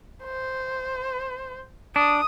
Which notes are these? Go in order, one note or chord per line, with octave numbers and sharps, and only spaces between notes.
C5
D4 D#6